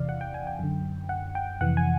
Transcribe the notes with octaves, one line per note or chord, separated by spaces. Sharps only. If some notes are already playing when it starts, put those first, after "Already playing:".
Already playing: E2 C3 E3 D5 F5
F#5
G5
G#5
G5
F#2 D3
F#5
G5
F2 C3 E3 F#5
G#5